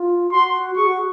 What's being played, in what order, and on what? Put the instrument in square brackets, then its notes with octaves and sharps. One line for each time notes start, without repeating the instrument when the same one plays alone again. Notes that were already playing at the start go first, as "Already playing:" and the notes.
Already playing: [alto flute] F4
[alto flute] F#4 [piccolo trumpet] C6
[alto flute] G#4 [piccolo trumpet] C#6
[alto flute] F#4